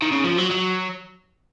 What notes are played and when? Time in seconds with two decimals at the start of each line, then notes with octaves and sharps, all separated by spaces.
0.02 D#3
0.12 C#3
0.25 F3
0.38 F#3
0.51 F#3